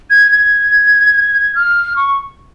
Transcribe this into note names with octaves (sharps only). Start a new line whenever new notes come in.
G#6
G#6
F6
C#6